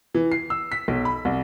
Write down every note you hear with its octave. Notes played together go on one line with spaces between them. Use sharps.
E3
C7
E6
B6
B1
B5
C2